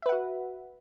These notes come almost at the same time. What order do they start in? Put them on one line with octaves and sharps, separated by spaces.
E5 B4 F#5 F#4